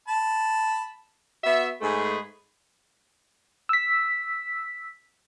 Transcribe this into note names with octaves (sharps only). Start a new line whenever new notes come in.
A5 B5
B3 F#4 E5
G#2 G#3 A3 G#4 B4
E6 B6